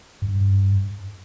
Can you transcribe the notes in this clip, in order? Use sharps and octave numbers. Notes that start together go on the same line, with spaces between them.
G2